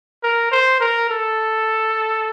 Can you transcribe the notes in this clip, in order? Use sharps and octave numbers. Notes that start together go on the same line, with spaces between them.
A#4
C5
A#4
A4